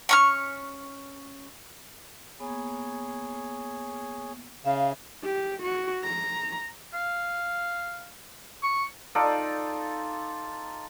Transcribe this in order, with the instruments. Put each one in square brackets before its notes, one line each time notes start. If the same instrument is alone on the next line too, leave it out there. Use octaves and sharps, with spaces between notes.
[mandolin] C#4 C#6 F6
[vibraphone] A#3 B3 [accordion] G#4 C#5
[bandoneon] C#3 [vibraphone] E5 [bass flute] F5
[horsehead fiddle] G4
F#4
A#5
[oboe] F5
C#6
[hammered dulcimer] D#4 F4 A4 D5